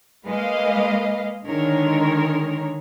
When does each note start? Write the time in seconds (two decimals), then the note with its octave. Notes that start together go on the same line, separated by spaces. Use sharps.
0.25 G#3 A#3 B4 D#5 F5
1.45 D3 D#3 G#3 A#4 C#5